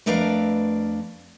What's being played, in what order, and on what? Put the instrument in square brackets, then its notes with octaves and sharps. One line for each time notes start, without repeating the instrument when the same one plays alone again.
[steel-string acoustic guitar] F2 A3 D4 A#4 B4 F5